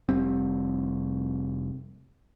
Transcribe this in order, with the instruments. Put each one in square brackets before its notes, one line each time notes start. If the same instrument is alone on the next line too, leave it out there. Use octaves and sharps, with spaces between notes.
[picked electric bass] F1 G3 C4